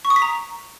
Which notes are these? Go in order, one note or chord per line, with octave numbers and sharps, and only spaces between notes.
C#6
D#6
B6
A#5